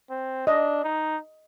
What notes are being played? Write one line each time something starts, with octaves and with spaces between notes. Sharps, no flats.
C4
D4 D#5
D#4